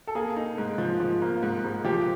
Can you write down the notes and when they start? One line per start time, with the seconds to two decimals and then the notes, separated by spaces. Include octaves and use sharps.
0.07 A4
0.15 A#3 G#4
0.37 D#4
0.58 G#2
0.78 F3
1.00 F3
1.22 A#3
1.43 G#2
1.64 G#2
1.84 F3 G4